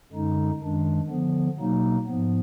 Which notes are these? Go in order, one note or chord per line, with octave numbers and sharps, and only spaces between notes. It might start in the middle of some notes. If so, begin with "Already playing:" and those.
F#2 D3 G#3 D#4
F#2 D#3 G#3 D4
D3 F3 B3
B2 F#3 A#3 D#4
G#2 F3 B3